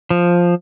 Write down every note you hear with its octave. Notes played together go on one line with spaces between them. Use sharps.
F3